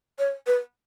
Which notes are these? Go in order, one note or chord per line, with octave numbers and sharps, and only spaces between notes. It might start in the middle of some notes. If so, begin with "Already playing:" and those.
C#5
B4